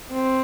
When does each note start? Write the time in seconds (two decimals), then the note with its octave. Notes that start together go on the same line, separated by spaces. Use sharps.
0.12 C4